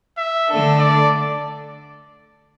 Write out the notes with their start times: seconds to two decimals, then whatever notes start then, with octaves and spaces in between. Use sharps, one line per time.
0.18 E5
0.48 D3 A3 D4 A4
0.79 D5